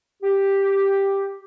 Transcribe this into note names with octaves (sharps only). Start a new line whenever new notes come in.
G4